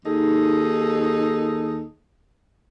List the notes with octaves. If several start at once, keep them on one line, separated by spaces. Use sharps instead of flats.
D#2 D#4 G#4 A4